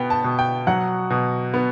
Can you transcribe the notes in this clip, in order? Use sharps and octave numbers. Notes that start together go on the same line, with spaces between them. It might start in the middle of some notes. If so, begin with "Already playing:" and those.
Already playing: B2 B3 G5
A5
B2
G5
F#3 F#5
B2
B3